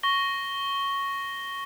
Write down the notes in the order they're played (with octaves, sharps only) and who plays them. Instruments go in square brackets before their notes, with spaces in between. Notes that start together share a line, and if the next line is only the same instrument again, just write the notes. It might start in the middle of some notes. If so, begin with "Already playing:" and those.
[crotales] C#6 A#6 G7